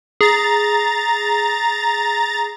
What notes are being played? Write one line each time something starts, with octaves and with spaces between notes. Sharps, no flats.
G#4 A#5 A6